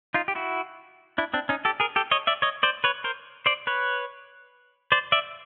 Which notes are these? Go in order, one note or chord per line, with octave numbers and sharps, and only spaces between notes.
D#4 F4
G4
E4 F#4
D4 E4
C4 D4
C#4 D#4
G4 A4
G#4 A#4
G4 A4
C#5 D#5
D5 E5
C#5 D#5
C5 D5
B4 C#5
A#4 C5
C5 D5
B4 C#5
C5 D5
D5 E5